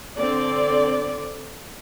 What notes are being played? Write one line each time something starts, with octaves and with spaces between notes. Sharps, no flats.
D3 C4 D5